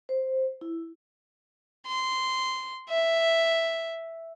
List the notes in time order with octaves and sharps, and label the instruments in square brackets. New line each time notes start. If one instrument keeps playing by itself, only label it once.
[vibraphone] C5
E4
[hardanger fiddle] C6
E5